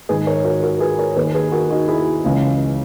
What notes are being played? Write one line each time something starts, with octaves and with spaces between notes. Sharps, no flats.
G#2 D#3 G#4 B4
A#4 C#5
F#4 A#4
F#4 A#4
G#4 B4
A#4 C#5
D#2 D#3 G#4 B4
G#4 B4
F#4 A#4
D#4 F#4
E4 G#4
C#2 C#3 E3